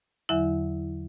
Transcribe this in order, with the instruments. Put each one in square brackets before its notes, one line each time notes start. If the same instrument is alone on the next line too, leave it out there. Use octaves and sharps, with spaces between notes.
[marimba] E2 D3 F#3 E4 E5